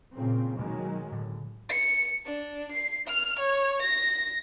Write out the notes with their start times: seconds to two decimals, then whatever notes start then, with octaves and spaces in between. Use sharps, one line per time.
0.14 A#2 C#3 C4
0.59 B2 D#3 F#3 G#3 A#3
1.12 A2 D3
1.69 C#7
2.25 D4
2.72 C7
3.07 F6
3.39 C#5
3.82 A#6